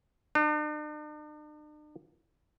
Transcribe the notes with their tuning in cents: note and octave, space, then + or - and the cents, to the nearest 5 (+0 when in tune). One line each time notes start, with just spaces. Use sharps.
D4 +45